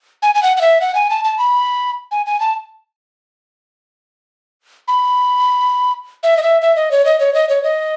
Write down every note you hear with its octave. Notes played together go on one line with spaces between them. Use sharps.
G#5
G#5
F#5
F#5
E5
F#5
G#5
A5
A5
B5
G#5
G#5
A5
B5
E5
D#5
E5
E5
D#5
C#5
D#5
C#5
D#5
C#5
D#5